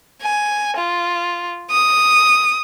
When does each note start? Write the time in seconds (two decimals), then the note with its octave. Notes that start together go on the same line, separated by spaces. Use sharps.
0.22 G#5
0.77 F4
1.71 D#6